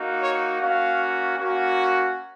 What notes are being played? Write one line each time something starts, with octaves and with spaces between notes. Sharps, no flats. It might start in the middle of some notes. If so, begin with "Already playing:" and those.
Already playing: A#3 D#4 F#4
C#5
A#3 C#4 F#4 F5
A#3 C#4 F#4